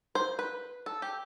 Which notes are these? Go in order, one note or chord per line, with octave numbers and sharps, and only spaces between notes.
C5
B4
A4
G4